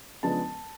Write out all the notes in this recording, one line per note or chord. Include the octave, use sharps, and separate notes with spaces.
C#3 F3 G#3 B3 D4 A5